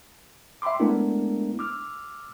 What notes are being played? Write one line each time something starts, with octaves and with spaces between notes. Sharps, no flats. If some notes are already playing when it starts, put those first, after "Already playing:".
E5 G5 B5 C6 D6
G#3 A3 B3 D4 E4 A#4
D6 E6 F6